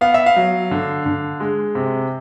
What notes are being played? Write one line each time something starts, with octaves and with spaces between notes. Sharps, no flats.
B3 F5
E5
F5
F#3
D3
D3
G#3
C3